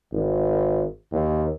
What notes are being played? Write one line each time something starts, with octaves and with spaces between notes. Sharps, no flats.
G#1
D#2